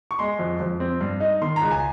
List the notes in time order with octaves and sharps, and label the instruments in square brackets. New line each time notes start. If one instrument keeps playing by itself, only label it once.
[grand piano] C#6
G#3 C6
F2
F2
C4
G2
D#4
D#3 C6
A#5
C#2
G#5